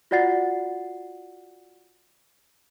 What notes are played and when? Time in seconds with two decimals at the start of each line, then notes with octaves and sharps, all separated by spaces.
0.11 F4 F#4 D5 F#5 A6 C7